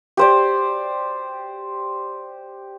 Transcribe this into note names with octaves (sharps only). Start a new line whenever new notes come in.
G4 C5 D5